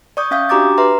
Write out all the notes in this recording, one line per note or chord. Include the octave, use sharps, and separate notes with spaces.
D5 C#6 D#6 G6
C#4 E5 F5 D#6 G6
D4 F#4 G4 A#5 D6 A6
B4 E5 A#5 C6